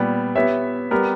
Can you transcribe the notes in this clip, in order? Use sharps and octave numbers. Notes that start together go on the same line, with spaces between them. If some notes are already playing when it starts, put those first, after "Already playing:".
Already playing: A#2 G3 B3
B3 G4 C#5 E5
G3 B3 G4 A#4